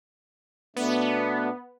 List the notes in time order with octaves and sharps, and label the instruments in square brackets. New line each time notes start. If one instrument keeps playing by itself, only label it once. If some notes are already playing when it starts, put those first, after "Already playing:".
[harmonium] B2 A3 D4 [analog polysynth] B3